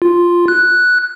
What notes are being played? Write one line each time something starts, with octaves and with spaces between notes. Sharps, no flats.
F4
F#6